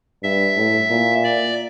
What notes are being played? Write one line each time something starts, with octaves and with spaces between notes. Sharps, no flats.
G2 E5
A2
A#2
D5